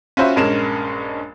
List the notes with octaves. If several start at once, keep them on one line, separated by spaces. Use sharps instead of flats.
C#4 F4 F#4 C5 E5 B5
A#1 G2 G#3 C#4 A#4 E7